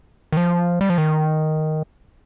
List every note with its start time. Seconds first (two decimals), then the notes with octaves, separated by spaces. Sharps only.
0.32 D#3
0.37 F3
0.81 G3
0.90 F3
0.98 D#3